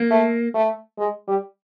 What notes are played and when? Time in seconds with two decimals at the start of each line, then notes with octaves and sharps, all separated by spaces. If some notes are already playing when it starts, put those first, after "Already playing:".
Already playing: A#3
0.11 A3
0.54 A3
0.98 G#3
1.28 G3